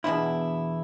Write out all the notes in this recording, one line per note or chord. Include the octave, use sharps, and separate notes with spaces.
E2 B2 D3 E3 D4 E4